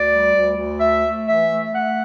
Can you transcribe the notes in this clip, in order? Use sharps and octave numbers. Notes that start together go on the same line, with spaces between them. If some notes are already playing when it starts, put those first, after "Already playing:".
Already playing: D2 D5
G3
D2
D2
A3 E5
A3
E3 E5
A3
A3 F#5